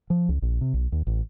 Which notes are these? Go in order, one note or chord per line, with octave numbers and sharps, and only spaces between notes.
F3
C#2
A#1
C3
B1
D#2
A1